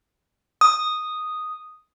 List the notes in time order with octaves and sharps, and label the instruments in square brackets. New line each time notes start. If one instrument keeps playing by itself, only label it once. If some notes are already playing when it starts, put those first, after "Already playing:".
[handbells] D#6